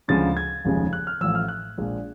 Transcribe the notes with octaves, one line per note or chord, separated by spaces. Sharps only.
D2 C#3 F3 G#3 A6
G#6
F1 D#2 C#3 F3 G#3
F#6
F6
A1 A2 F3 E6
F6
F#6
A#1 A#2 F3 G#3